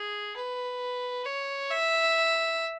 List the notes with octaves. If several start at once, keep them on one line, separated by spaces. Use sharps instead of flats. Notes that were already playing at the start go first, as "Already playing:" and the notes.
Already playing: G#4
B4
C#5
E5